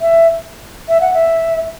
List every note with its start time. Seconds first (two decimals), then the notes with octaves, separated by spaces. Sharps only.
0.01 E5
0.89 E5
1.01 F#5
1.14 E5